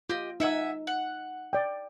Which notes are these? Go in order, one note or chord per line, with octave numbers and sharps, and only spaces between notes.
F4 G4 D#5
D#4 E5 F#5 G#5 E6
F#5
D5 G5